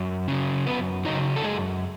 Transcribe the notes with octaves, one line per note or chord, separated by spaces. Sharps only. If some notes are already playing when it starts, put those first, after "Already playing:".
Already playing: F#2
C#3 F#3
F#2 B3 B4
C#3 F#3 D#4 D#5
A4
F#2 G#3 G#4